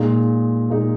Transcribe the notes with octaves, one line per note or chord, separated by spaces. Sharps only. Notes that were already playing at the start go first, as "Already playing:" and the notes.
Already playing: A#2 G#3 D#4
A#2 G#3 D#4